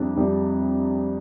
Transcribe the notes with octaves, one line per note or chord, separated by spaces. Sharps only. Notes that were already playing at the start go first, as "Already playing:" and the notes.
Already playing: F2 C3 G3 D4 E4
F2 C3 G3